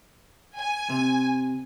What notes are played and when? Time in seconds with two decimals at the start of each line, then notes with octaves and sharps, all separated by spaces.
0.58 G#5
0.90 C3